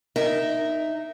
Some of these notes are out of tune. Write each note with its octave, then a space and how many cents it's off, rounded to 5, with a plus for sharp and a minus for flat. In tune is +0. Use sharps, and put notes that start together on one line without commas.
D#4 -10 A#4 +0 E5 +0